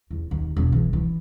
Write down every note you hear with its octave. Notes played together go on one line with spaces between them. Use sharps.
E2
D#2
E1
E3
E3